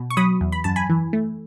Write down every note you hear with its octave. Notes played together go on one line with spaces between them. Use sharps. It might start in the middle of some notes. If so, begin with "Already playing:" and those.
Already playing: B2
C#6
F#3 B5 D#6
E2
B5
F#2 A5
G#5 B5
E3
A3